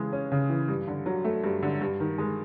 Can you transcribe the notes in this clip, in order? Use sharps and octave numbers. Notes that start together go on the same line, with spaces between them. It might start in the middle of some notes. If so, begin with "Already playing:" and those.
Already playing: C#3 E3 G#3
C#4
C#3
E3
G2
D3
F#3
A3
G2
D3
G2
D#3
G#3